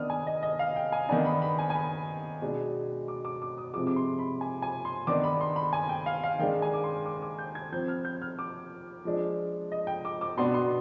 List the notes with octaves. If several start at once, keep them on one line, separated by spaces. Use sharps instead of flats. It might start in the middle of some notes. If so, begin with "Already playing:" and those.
Already playing: D#3 B3 D4 D#6 F6
G#5
D#5
D#5
F5
G5
G#5
D#3 B3 D4 G#5
B5
B5
G#5
G#5
B5
B2 G#3 D4
D6
D6
D6
D#6
C3 F3 G#3 D6
D6
C6
B5
G#5
G#5
C6
D#3 B3 D4 D6
B5
C6
B5
G#5
G5
F5
F5
D#3 G#3 D4 G5
G#5
D6
C6
D6
D6
G6
G#6
F3 C4 G6
F6
G6
F6
D6
F3 G#3 D4
D#5
G5
D6
D6
B2 B3 D4 C6
C6